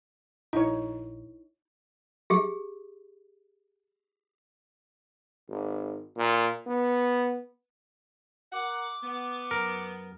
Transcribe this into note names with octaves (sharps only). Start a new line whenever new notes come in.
A#1 D#4 E4 C#5
G4 G#4
G#1
A#2
B3
A#4 F#5 D6
B3 F#5
F#2 A#4